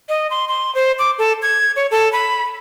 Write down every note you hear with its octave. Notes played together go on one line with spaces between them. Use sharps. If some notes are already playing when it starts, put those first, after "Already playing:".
D#5
C6
C6
C5
D6
A4
G#6
C#5
A4
B5